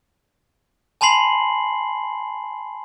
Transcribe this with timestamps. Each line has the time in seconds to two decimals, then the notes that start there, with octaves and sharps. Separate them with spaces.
1.01 G#5 A5 B5 C6 C7 F#7